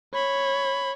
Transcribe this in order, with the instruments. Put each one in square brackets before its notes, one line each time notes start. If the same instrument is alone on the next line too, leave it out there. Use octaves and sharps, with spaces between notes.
[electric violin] C#5 [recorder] B5